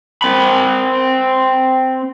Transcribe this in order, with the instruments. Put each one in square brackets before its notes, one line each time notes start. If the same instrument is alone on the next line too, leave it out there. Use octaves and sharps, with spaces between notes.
[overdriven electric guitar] C4 B5